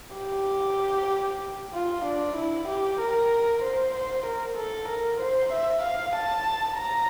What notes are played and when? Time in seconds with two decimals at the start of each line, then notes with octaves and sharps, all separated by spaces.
0.16 G4
1.74 F4
2.05 D4
2.36 E4
2.68 G4
3.00 A#4
3.63 C5
3.95 C5
4.26 A#4
4.57 A4
4.88 A#4
5.20 C5
5.52 E5
5.83 F5
6.16 A5
6.78 A#5